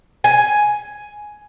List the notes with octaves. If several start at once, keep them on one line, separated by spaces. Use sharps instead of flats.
G#5